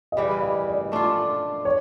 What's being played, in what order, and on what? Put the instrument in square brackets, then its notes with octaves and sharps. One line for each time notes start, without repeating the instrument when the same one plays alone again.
[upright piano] D#5
[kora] C#3 E3 G3 [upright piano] D5
[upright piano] D#5
D5
[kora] A3 D4 F4
[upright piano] C#5